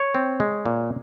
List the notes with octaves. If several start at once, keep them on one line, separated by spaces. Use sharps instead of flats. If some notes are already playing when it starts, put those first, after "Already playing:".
Already playing: C#5
C4
G#3
A#2